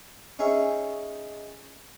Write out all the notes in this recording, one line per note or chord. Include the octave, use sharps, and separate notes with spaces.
C#4 D#4 G#4 C#5 E5